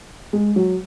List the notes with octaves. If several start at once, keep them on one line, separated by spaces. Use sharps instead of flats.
G#3
F#3